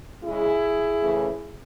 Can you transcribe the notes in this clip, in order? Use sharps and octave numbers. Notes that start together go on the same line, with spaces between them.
C#3 G#3 C#4 E4 G#4
C#3 E3 A3 C#4